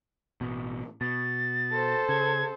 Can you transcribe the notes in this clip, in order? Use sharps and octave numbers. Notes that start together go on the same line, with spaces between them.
A1 B2
B2 A6
A4 C5
C#3 G#6